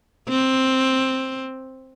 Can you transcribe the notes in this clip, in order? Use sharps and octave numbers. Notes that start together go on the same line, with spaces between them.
C4